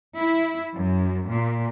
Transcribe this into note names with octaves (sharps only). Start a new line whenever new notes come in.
E4
F#2
A#2